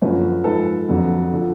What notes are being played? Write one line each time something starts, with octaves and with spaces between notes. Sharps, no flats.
F#2 D3 F3 B4 C#5
G#2 F3 A4 B4
F2 D3 F#3
D3 F3